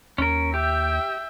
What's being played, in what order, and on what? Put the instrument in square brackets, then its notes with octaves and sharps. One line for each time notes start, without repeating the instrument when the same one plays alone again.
[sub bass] D#2 [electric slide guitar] C#4 A#4
[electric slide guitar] G4 [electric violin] E5 G5